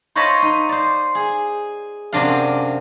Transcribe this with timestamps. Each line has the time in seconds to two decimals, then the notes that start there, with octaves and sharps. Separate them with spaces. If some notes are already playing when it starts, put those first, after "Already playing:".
0.15 C5 C#5 D#5 F5 A5 B5
0.42 D#4
0.69 C5 D5
1.15 G#4
2.13 F#2 C3 D4 D5 F5